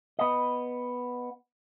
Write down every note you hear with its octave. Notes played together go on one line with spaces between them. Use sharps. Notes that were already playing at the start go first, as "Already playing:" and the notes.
B3 D#5